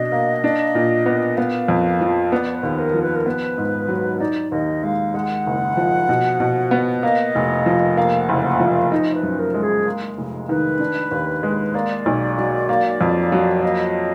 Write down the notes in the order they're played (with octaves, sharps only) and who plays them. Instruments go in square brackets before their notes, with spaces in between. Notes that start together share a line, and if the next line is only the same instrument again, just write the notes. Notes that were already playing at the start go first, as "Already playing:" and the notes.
Already playing: [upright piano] B2 D4 [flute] D#5
[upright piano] A#3
D4
A#2
B3
[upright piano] B3 [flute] F5
[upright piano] F2
F3
[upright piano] B3 [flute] D5
[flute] B4
[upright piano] D#2
[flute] A#4
[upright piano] F3
[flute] B4
A#4
[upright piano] B3 [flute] B4
[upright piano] G#2
F#3
[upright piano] D#4 [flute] D5
[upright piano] D#2 [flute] D#5
[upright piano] G#3 [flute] F5
[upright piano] G#3 [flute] F#5
[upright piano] F#1
F3
B2
B2
B3
[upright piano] A#3 [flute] D#5
[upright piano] F1
F3
[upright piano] A#3 [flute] F5
[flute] F#5
[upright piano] F#1
[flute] F#5
[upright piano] F3
[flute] F5
[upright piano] D#4 [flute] D#5
[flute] B4
[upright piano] F#2
[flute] A#4
[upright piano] G#3
[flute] G#4
[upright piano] A#3
F1
[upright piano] D#3 [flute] B4
[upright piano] D4
D#2
G#3
[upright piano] A#3 [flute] D5
[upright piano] B1
F#3
A#3
F2
F#3
[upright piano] A#3 [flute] D#5